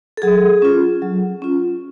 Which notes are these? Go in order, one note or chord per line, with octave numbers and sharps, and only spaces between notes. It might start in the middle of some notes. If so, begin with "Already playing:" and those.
A4
F#3 G#4
C#4 F4
F#3
C#4 F4